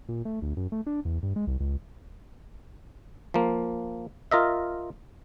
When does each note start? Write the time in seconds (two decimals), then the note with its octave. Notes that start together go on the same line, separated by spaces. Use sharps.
0.09 A#2
0.25 A3
0.42 D2
0.57 F#2
0.72 A3
0.87 D4
1.05 E2
1.23 G2
1.36 G#3
1.47 C2
1.60 C#2
3.34 F3 A#3
4.31 F4 A#4 D#5 E5